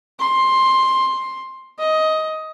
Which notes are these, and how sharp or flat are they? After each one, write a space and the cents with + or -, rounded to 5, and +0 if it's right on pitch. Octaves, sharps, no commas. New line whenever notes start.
C6 +10
D#5 +15